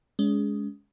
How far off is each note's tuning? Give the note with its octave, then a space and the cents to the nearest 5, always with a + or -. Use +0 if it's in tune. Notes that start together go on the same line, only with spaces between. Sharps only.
G#3 +0 C#4 +35